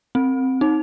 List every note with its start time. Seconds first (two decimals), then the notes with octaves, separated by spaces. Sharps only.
0.15 C4
0.61 D#4